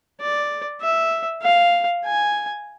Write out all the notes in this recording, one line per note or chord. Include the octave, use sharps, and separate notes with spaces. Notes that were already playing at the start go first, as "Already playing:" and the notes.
D5
E5
F5
G#5